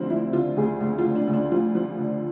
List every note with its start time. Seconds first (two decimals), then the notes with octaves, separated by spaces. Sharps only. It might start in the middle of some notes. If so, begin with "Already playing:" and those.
Already playing: D2 D3 F3 C4 D4
0.10 F3 E4
0.33 D3 F4
0.57 D2 G#4
0.81 D2
0.98 F4
1.04 D3
1.15 D4
1.28 D2
1.34 D4
1.52 F3 F4
1.75 F3
1.98 D3